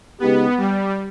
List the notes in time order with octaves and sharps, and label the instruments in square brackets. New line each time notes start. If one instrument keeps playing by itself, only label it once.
[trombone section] C#3 G#3 D#4 G4 [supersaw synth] B3
[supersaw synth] G3